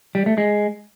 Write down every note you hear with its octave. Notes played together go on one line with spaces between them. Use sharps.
G3
A3
G#3